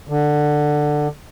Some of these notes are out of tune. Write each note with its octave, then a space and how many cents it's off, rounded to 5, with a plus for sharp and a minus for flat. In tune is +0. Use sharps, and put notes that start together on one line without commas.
D3 +15